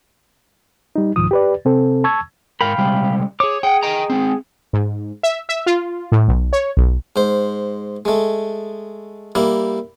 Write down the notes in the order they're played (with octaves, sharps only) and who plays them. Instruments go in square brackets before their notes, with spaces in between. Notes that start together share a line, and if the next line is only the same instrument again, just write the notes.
[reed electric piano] G3 D#4
C2 G#2 D#3 F3 D#6
G4 B4 D5
C3 C4 A4
A5 C#6 E6 G#6
[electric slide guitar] G#2 A#4 [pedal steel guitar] F5 G5 B5
[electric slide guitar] C3 G3 G#3
[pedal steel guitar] G#4 D6 [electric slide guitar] C#5
[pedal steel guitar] G#4 [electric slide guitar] F#5 G5
[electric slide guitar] D#5 G5 A#5
G#3 C4
[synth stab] G#2
E5
E5
F4
A2
B1
C#5
B1
[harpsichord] G#2 C5
G#3 A3
G3 A#3 E4